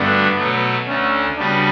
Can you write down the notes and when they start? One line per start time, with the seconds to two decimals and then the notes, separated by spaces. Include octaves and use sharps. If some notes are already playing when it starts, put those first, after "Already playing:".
Already playing: G2 D3 A3 B3 D4 F#4
0.37 B2 F#3 A3
0.87 D2 D3 A3 C#4
1.37 C#3 G3 B3 D4 F#4